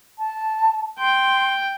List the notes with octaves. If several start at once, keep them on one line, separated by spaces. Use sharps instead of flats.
A5
G5 C6